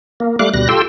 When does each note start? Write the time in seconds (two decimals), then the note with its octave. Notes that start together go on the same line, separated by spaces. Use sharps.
0.20 A#3
0.39 G3 A3 F5 D6 F#6
0.54 D2 B2 G3 F#6 A#6
0.69 F4 G4 A4 G5 C6 E6